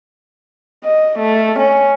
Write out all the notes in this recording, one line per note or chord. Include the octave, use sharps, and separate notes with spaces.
D#5
A3
C#4